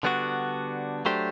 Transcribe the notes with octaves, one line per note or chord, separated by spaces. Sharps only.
D3 G3 B3 D4 F#4
F#3 A3 D4 G4 C5